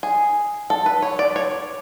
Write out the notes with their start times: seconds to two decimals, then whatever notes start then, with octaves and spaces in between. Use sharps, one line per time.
0.03 G#4
0.70 A4
0.86 B4
1.02 C#5
1.19 D5
1.36 C#5